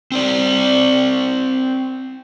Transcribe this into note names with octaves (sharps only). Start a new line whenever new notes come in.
C4 C5 D5